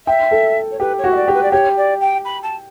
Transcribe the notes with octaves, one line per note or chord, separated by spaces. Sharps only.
E5 G5
A4
C#5
G4 B4
C#5
F#4
E5
D5
G4
B4
D5
G4 C#5
D5
G5
B5
A5